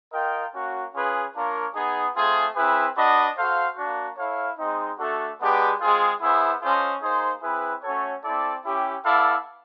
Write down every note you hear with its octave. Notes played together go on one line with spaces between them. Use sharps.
F4 A#4 D#5 G5
A#3 C#4 F#4
C#4 F4 G#4 B4
A#3 D4 F4 A#4 C#5
B3 D#4 G#4
A3 C4 F4 G#4
C4 E4 G#4 B4
D4 F#4 B4 D#5
F#4 A4 C5 F5
A#3 D4 F#4
E4 A4 C#5 F5
G#3 C4 D#4
A3 D4 F#4 A4
G#3 B3 D4 G4 B4
G#3 C4 F4 G#4
B3 E4 G#4 C5 E5
C#4 F4 A4 C5 D#5
A#3 D#4 G#4 C5
C4 E4 G#4 B4
A3 C#4 F#4 A4 C#5
C4 E4 A4 D5
C#4 E4 G4
B3 E4 A4 D5 F5